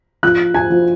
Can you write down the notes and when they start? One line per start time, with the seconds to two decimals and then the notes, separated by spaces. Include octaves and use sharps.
0.23 F3 F#6
0.54 G#5
0.70 F3